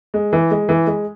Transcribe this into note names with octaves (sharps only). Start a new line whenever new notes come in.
G#3
E3
G#3
E3
G#3